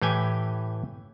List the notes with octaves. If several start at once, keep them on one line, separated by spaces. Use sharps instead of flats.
A2 E3 G4 G5 G#5